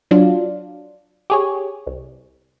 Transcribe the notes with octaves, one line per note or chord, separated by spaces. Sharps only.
F#3 D4 F4
G4 G#4 C#5
C2